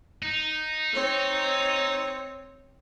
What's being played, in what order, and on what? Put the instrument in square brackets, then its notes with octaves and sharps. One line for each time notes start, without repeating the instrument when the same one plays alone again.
[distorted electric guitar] D#4
[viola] C4 C#5